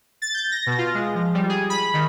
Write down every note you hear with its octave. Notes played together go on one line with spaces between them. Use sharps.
A6
G6
A#6
B2
F4
G#3
F3
G3
G#4
B5
D#3